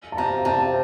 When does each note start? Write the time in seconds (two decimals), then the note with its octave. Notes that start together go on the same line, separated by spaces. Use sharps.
0.12 A5
0.17 C3 A#5
0.45 C3 A5